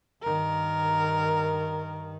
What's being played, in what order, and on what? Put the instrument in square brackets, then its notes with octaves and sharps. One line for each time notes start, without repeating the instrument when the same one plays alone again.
[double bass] G2 D#3 [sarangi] A#4